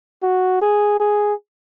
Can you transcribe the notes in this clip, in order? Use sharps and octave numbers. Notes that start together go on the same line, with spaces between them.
F#4
G#4
G#4